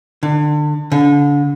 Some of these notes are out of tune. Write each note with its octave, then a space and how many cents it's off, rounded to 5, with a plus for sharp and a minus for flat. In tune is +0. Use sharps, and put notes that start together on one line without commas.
D3 +30
D3 -30